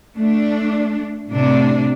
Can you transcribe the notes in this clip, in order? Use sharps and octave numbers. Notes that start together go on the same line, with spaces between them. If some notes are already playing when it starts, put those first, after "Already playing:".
A3 D4
A2 C3 D4